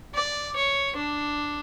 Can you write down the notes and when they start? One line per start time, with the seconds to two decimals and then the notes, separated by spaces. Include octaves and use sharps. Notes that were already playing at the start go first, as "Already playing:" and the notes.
0.15 D5
0.56 C#5
0.96 D4